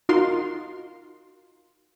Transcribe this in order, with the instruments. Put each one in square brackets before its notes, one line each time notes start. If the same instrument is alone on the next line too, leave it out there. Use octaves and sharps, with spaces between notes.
[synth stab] D#4 F4 F#4 A#4 F5 C6